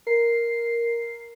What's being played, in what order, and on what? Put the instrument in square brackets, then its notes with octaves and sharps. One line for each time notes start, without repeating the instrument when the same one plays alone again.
[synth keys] A#4 C7